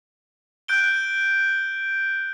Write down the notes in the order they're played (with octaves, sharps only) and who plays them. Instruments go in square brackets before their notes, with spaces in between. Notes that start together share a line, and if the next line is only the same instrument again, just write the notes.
[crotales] F#6 G6 D7 G7